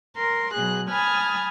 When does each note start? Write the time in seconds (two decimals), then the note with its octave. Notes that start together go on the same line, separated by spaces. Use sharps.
0.17 A#4 C6
0.53 B2 F#3 G#4 F#6
0.90 G#5 A5 B5 D#6 F6 G#6